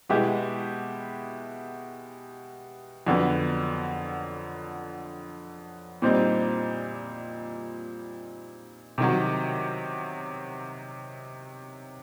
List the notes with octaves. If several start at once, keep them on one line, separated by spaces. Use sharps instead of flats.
B2 G#3 B3 E4 G4
F2 D3 F#3 B3
A#2 G3 C4 D#4
C3 D#3 F#3